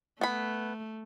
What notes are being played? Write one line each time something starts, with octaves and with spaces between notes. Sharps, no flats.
A3 B3 B5